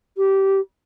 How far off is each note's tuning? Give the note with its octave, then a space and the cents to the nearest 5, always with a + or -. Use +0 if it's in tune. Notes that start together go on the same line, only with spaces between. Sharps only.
G4 -15